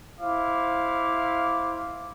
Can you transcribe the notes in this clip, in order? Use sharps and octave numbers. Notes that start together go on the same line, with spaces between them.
E4 C5 F5 D6